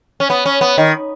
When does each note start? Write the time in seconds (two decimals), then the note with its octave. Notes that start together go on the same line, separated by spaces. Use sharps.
0.20 C#4
0.30 B3
0.46 C#4
0.61 B3
0.78 D#3